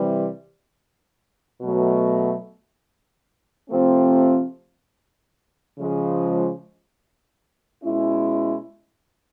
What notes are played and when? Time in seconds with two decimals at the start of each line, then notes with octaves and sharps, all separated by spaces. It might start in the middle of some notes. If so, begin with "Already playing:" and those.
Already playing: C3 E3 G3
1.62 B2 F#3 A3
3.70 C3 F3 A3 C4
5.77 C#3 F3 G#3
7.83 B2 G#3 C#4 E4